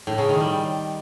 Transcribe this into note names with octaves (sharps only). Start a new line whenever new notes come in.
A2
C#3
D#3
G3